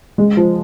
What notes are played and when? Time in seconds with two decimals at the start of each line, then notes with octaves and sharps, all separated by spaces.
0.18 G#3
0.37 F3